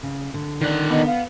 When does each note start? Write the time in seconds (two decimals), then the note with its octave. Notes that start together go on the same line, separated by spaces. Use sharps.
0.03 C#3
0.34 D3
0.61 D#3 D5 F#5
0.91 B3 D#5
1.06 F5